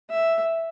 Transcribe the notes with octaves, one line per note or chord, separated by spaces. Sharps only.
E5